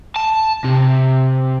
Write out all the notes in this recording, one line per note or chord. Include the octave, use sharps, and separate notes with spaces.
A5
C3